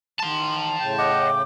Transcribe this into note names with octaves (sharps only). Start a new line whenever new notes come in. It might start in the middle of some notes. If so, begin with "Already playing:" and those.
D#3 A5 C6
A2 C#3 G5
D#5 F#5 D6